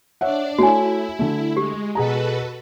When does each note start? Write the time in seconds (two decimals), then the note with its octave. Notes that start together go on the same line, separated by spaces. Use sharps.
0.21 D4 C#5 D5 E5 F#5
0.58 A3 E4 F#4 C#5 G#5
1.19 D3 A3
1.57 G#3 G4
1.95 B2 F#4 G#4 A4 B4 A#5